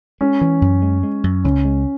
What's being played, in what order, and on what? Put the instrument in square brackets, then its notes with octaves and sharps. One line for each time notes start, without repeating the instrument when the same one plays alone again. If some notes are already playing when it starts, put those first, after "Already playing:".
[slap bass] G#3 [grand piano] C#4
[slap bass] E3
F#2
G#3
G#3
F#2
[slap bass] C#2 [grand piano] C#4
[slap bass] G#3